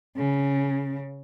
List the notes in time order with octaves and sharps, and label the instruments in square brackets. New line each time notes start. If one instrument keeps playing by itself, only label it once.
[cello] C#3